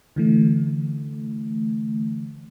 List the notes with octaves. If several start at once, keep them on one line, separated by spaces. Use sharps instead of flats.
D3 E3 A3